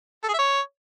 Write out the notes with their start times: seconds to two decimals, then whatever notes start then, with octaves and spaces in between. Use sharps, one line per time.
0.24 A4
0.29 G#4
0.34 E5
0.39 C#5